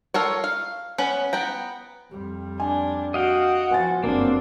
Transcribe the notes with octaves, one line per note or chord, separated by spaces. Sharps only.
F4 A4 A#4 C#5
F5
B3 C#4 B4
B3 G5 A#5
F2 G3
D4 G#5
F#4 D#5 F5 G5
F3 B3 G#5 A6
F#1 G2 A#3 C4 D4